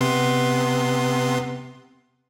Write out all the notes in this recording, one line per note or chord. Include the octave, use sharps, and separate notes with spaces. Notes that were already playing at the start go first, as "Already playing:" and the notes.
C3 B3 C6